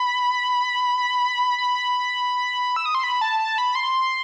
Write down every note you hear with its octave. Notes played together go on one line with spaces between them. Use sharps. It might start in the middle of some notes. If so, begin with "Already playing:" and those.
Already playing: B5
B5
E6
D#6
C6
B5
A5
A5
B5
C6